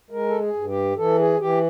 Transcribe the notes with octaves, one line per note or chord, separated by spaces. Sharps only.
G#3 A#4
A4
G#4
G2
G4
E3 A4
G#4
E3 G4